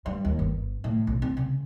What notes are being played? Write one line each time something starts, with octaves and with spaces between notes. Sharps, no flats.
G2
D#2
G1
A2
B1
C4
C#3